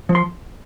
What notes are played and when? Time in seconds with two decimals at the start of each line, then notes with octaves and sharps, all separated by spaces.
0.09 F3
0.15 C6